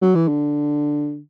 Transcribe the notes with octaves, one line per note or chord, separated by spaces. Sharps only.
F#3
E3
D3